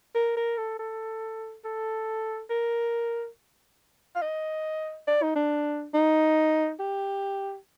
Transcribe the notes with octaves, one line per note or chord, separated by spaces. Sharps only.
A#4
A#4
A4
A4
A4
A#4
F5
D#5
D5
D#4
D4
D#4
G4